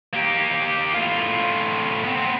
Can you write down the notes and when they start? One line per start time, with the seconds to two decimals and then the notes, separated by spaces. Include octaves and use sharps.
0.13 A#3 G4
0.94 A2 F4
2.04 B3 C4